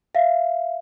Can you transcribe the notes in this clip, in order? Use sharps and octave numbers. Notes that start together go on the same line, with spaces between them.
E5 F5